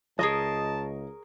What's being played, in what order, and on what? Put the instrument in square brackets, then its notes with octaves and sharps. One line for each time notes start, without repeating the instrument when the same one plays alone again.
[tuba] C#2 [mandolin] G#4 A#4 C#5 [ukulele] D#5 [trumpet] A5